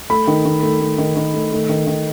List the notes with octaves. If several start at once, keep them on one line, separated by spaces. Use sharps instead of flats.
A3 B5
D#3
D#3
A3
A3
D#3
D#3
A3
A3
D#3
D#3